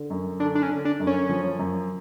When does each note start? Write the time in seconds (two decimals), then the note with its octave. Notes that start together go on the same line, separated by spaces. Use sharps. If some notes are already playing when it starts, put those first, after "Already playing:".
Already playing: D3
0.10 F#2
0.40 D3 D4
0.55 D4
0.63 C#4
0.70 D3
0.85 D4
1.00 F#2
1.07 C#4
1.29 F3
1.59 F#2